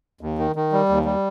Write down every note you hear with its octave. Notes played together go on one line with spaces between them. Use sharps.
D#2
D#3
D#3
G3
D#2
G3